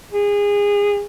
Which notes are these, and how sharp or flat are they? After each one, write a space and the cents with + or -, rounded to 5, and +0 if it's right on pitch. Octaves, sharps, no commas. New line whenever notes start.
G#4 -25